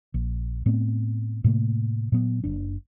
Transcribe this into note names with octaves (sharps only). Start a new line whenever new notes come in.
A#1
A2 A3 B3 C4
A2 C3 A3 A#3
A#2 F#3 B3
F#1 D4